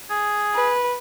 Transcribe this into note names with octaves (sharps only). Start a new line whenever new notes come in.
G#4
B4